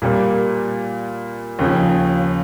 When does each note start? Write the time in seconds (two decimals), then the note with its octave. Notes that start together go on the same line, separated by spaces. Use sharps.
0.02 A#2 G3 A#3
1.59 D#2 C#3 F3